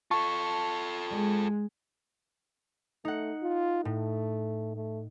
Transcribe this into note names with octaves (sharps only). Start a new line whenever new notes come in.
F4 A4 A5 C#6
G#3
A3 D#4 F#5
F4
A2 A3
A3